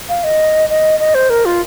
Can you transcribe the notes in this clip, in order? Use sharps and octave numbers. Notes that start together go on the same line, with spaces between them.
F5
D#5
D#5
D#5
C5
A#4
F4